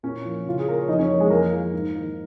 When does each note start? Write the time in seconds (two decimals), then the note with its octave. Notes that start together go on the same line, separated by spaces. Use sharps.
0.03 A#2 C#4 C#5
0.25 F3 A#3
0.46 C#3 F4
0.59 G#4
0.68 A#3 A#4
0.79 C#5
0.88 F2 D#4 D#5
0.99 C#4 C#5
1.10 F3 A#3
1.20 G#3 G#4
1.30 F2 A#3 A#4
1.53 F3 A#3
1.73 G#2
1.95 D#3 A#3